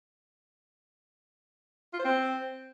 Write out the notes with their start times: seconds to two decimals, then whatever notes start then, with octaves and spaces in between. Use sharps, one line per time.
1.94 F4
1.99 C5
2.05 C4